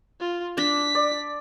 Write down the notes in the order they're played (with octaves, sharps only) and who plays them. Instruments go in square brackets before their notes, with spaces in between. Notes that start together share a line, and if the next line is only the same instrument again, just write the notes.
[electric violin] F4
[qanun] D4 [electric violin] B6
[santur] D5